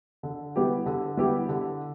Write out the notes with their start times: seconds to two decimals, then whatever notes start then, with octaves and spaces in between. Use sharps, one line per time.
0.23 D3
0.56 G3 B3 E4 G4
0.86 D3
1.17 G3 B3 E4 G4
1.49 D3